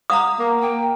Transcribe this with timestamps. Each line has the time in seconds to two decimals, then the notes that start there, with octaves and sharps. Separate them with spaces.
0.10 F5 F#5 A#5 D#6
0.39 A#3
0.62 A#3 G5